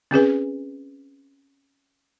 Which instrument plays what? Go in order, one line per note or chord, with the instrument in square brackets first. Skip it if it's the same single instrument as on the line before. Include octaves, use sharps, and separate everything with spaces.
[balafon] C4 C#4 G#4 B4